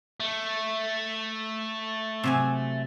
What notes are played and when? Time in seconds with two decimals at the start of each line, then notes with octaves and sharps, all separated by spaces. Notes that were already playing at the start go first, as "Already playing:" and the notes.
0.20 A3
2.24 C3 F#3 G#5